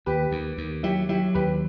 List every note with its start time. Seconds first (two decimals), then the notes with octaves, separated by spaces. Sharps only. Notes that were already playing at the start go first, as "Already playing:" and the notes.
0.06 D#2 G4 B4
0.31 D#2
0.58 D#2
0.83 F#3 E4 G4
1.09 F#3 E4 G4
1.34 D#2 G4 B4